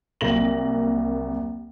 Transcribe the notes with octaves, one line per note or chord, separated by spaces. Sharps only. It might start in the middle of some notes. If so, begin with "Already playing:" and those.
C2 F#3 A#3 A#6 F#7